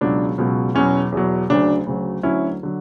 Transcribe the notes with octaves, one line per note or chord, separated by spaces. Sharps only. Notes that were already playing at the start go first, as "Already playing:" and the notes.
C#2 B2 F#3 D4
C#2 B2 F#3
E2 B2 F#3 C#4
E2 B2 F#3
D2 C#3 F#3 D4
D2 C#3 F#3
D2 D3 F#3 C#4 E4
D3 F#3